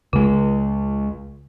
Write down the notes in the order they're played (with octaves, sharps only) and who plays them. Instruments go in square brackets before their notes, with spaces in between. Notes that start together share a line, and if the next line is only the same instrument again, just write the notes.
[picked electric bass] C#2 G#3 [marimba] C#3